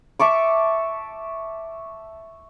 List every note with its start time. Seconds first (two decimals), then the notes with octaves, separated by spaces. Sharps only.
0.19 E5 A5 C#6 D6